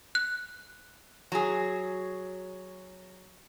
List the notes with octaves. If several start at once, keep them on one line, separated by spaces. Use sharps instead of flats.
F#6
F#3 G#4